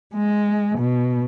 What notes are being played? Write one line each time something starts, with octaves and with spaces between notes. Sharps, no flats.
G#3
B2